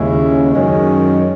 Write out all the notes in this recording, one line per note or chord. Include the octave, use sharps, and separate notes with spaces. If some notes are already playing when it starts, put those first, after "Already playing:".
Already playing: D#2 C#3 G#3 C#4 E4
F#2 D#3 G#3 C#4